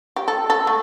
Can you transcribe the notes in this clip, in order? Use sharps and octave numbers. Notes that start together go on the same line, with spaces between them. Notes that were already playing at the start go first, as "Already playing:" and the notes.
G4
A4
A4
A3